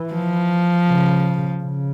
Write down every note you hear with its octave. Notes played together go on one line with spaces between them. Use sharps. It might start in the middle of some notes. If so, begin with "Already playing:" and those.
Already playing: E3
F3
C#3
C#3